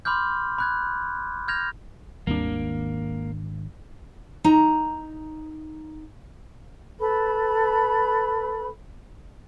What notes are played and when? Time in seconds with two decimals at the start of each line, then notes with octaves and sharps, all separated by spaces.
0.05 B5 C6 D6 F6 G6
0.58 B5 F#6 G#6
1.48 F6 G6 G#6 A#6 F7
2.27 G#1 D#2 B2 G3 A#3 C4 D4
4.44 D#4 A#5
6.99 A4 B4 B5